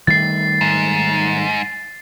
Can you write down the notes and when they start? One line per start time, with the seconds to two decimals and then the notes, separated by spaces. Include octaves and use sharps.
0.07 D#3 G3 A3 A6 C7
0.61 G#2